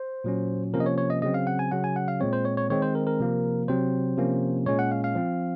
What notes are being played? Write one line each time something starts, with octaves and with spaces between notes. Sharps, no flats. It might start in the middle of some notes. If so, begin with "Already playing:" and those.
Already playing: C5
A#2 F#3 C#4
C3 F3 A#3 C#4 A#4
D#5
C#5
C#5
D#5
C#3 F#3 C4 D#5
F5
F#5
G#5
C#3 F#3 C#4 F#5
G#5
F#5
F5
A#2 G#3 C4 C#5
C5
C#5
C#5
D#3 G#3 C4 C#5
C5
A#4
A#4
C3 F3 A#3
C3 F#3 C4 C5
C3 F3 A#3 C#4
A#2 G#3 C#4 C#5
F#5
F5
F5
F3 C4